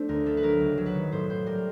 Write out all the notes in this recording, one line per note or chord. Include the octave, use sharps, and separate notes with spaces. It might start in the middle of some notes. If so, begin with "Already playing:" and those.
Already playing: A3 D4 C5
D2 A#4
A3 A4
B4
F#3 A#4
C#2
F#3
B4
D#3
A2 C5
A2 C5
G3 A#4